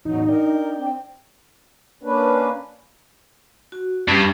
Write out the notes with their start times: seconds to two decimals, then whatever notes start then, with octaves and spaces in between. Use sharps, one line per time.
0.05 E2 A2 C#3 E3 F#3 D#4
0.28 D4 A#4 D5 G5
0.77 C4
2.03 A#3 C#4 D4 B4
3.72 F#4
4.08 G2 G3 C#4 G4